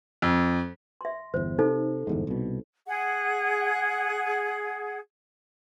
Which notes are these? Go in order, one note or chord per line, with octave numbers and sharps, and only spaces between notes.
F2
E5 C6
G1 E2 C5
C3 D#4 A4 C5
G1 E2 G#2
C2 B2
G#4 F#5